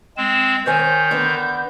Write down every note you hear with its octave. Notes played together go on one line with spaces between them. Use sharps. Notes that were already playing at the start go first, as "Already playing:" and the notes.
G#3 C4 E7
D#3 C5 C#5 G#5 G6
D3 B3